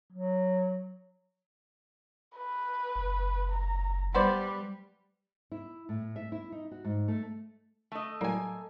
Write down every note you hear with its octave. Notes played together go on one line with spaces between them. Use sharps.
F#3
B4
F#1
A#5
G3 B3 B4 C5 D5
E4
A2
E5
E4
D#4
F#4
G#2
A3
A3 D#5
A2 F#3 G3 A#3 G#5